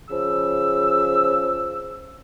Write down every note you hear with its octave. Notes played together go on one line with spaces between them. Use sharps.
C#3 F3 E6